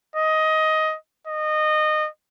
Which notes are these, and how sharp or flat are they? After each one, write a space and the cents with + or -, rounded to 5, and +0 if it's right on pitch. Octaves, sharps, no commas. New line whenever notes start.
D#5 +15
D#5 -20